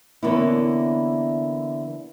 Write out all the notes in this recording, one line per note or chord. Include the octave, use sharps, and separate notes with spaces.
D3 E3 A#3 B3 C#4 E4